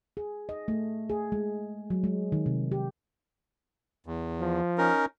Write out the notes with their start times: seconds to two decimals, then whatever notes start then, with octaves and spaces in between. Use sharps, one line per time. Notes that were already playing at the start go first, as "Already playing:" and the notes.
0.17 G#4
0.49 D#5
0.68 A3
1.10 G#4
1.32 G#3
1.90 F#3
2.04 G#3
2.32 D#3
2.46 C3
2.72 G4
4.06 E2
4.40 F3
4.78 C#4 D#4 A#4